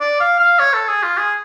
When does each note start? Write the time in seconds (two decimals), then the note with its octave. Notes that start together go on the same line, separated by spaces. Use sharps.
0.01 D5
0.20 F5
0.40 F5
0.59 C#5
0.73 A4
0.88 G#4
1.03 F4
1.17 G#4